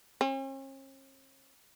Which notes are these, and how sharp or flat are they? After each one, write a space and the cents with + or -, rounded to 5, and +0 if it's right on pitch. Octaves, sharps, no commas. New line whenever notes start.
C#4 -45